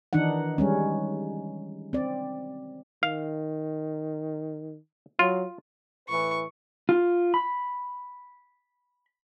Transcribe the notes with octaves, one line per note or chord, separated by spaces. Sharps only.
D#3 E3 D4 D#4 F#5
G3 G#3 C#4
C4 D5
D#3 F5
F#3 F4
A2 E3 B4 C#6
F4
B5